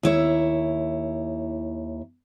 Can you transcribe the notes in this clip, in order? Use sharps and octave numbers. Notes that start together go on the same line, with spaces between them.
D#2 E4 C#5